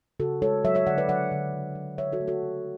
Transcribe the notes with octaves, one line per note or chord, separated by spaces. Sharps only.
C#3 F#4 A4
G#3 A4 C#5
F#3 C#5 E5
C#5 E5
D3 D5 F#5
B4 D5
F#3 D5 F#5
D3
C#3
F#3
D3 C#5 E5
F#4 A4
A3
F#4 A4
C#3